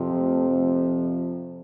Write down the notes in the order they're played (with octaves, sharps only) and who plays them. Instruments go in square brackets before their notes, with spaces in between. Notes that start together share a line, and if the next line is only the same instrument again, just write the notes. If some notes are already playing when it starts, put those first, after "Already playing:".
Already playing: [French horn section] F2 C3 F3
A3
F3